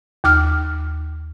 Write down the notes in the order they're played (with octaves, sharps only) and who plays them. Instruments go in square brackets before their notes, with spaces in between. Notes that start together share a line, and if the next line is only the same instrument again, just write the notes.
[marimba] D#2 D6 F6